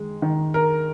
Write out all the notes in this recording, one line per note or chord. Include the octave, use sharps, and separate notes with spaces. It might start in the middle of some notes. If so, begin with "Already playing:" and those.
Already playing: D#3 G#3
D#3
A#4